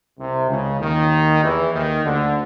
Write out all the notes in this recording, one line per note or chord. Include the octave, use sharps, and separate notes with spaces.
C2 C3
C#2 C#3
D#2 D#3
E2 E3
D#2 D#3
D2 D3